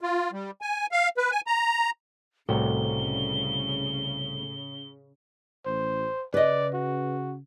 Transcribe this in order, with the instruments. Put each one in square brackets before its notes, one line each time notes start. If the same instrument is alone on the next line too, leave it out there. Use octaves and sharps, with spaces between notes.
[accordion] F4
G3
G#5
F5
B4
G#5
A#5
[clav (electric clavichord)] C2 F#4 G4 [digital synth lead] A2 [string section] C#3 [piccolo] G7
[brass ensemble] A1 [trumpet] C5
[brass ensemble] C#3 [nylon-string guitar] B4 D#5 [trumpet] D5
[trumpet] F#4